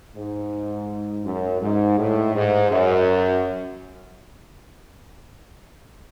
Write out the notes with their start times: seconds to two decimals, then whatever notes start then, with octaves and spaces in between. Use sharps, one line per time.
0.16 G#2
1.25 F#2
1.61 G#2
1.98 A2
2.35 G#2
2.71 F#2